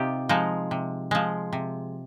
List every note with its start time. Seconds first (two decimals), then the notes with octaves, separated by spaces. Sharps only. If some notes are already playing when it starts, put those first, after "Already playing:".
Already playing: C3 C4 D#4 F4 G4
0.29 F3 G#3 D#4
0.71 C3
1.11 F3 G#3
1.53 C3